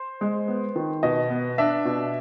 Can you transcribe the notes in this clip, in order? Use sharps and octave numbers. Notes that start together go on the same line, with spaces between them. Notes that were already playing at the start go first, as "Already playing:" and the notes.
Already playing: C5
G#3
B3
D#3
B2 D#5
B3
D4 E5
B2